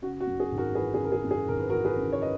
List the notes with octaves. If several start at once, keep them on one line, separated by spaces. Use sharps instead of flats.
C#3 F#4
F#4
F#2
G#4
G#1
F#4 A#4
E3 G#4 B4
G#4
C#3
A#4
G#4
F#2
G#4
G#1 A#4
B4
F#4 A#4
E3
G#4 B4
C#3
C#5
B4 D#5